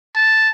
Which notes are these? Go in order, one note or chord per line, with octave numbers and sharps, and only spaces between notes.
A5